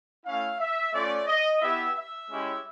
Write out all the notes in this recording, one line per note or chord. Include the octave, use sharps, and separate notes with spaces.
A3 C#4 E4 F5
E5
A3 C#4 F4 D5
D#5
B3 E4 G4 E5
E5
G#3 C#4 E4 G4